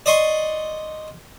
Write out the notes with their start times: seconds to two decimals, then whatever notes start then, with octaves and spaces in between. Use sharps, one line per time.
0.06 D5 D#5 C6 C#6